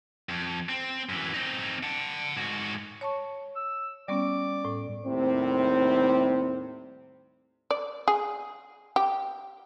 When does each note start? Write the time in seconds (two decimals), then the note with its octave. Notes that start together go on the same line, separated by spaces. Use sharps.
0.29 F2
0.69 C4
1.09 F#2 E3
1.34 C4 D#4
1.83 F#5 A5
2.37 G#2 F#4
3.01 C#5 A5 C#6
3.56 E6
4.08 G3 B3 C#4 D5
4.65 A2
5.05 D#2 A2 C3 G3 C4
7.71 D5
8.08 G#4
8.96 G4